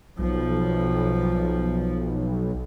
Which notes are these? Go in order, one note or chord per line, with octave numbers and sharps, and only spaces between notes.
B1 F3